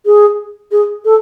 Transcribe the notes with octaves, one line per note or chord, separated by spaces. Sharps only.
G#4
G#4
A4